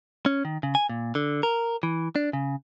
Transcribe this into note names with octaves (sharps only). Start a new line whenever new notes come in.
C#4
D#3
C#3
G#5
A#2
D3
A#4
E3
D4
C#3